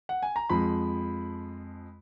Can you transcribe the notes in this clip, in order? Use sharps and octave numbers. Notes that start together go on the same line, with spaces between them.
F#5
G#5
A#5
F2 F3 G#3 B5